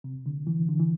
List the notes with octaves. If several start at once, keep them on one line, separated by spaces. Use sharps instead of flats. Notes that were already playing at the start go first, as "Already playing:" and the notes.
C3
D3
E3
D3
E3